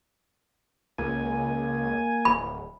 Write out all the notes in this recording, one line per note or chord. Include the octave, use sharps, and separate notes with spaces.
C#2 A#3 G#5
D1 B5